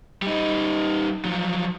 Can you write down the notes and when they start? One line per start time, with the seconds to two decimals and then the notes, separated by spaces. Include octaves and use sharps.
0.22 G3 D#4
1.25 F3 F#3